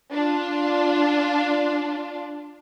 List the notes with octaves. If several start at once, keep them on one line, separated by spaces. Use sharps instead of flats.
D4 F4